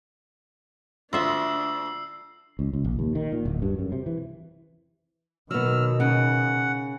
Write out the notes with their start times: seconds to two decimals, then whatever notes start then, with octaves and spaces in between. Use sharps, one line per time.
1.13 D2 D4 F4 E5 E6 C7
2.59 C#2
2.73 C#2
2.84 A#1
2.99 D#2
3.15 D#3
3.32 A#2
3.45 D1
3.62 G2
3.79 F#2
3.92 C3
4.06 E3
5.51 B2 D#3 F#3 B3 E6 F6
6.00 C#3 F#5